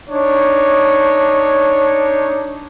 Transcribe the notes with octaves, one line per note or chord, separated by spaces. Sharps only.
D4 D#4 C#5